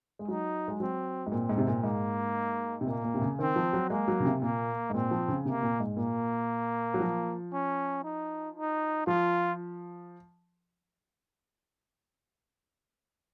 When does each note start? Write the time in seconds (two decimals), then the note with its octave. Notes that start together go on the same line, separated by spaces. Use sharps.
0.19 G#3
0.28 F#3 D#4
0.68 G#3
0.80 F#3 C4
1.26 G#2
1.32 A#2 C4
1.49 G#2
1.58 C3
1.67 A#2
1.83 G#2 A#3
2.81 C3
2.87 A#2 A#3
3.04 A#2
3.14 C3
3.22 C#3
3.39 D#3 C4
3.56 F3
3.73 F#3
3.90 G#3 A#3
4.08 F#3
4.20 C#3
4.25 C3
4.42 A#2 A#3
4.90 G#2
4.94 A#2 C4
5.11 F3
5.28 C#3
5.45 C3 A#3
5.63 A#2
5.80 G#2
5.97 A#2 A#3
6.94 F#3
7.00 F3
7.53 C#4
8.03 D#4
8.56 D#4
9.07 F3 F4